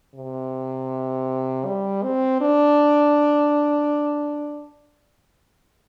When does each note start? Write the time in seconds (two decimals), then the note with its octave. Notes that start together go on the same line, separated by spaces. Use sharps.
0.15 C3
1.66 G3
2.03 C4
2.41 D4